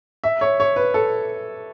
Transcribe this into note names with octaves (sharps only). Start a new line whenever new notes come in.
E5
C#5
C#5
B4
A4